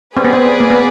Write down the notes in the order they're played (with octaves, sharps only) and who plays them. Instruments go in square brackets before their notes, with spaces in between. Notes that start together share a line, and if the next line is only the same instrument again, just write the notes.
[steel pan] C4 [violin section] G#4 B4 D5
[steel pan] B3
C4
A#3
B3